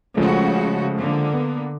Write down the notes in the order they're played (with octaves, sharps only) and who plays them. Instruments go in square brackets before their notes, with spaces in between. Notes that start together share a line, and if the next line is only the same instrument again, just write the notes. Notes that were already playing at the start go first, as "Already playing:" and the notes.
[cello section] C#3 F#4 [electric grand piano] F3 G#3 A3
[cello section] D3 A#3
[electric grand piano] B3